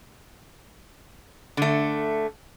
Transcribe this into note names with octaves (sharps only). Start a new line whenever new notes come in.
D3 A3